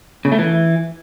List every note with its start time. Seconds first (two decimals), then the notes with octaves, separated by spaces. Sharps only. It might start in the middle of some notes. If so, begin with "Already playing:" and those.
0.25 C#3
0.32 A3
0.39 E3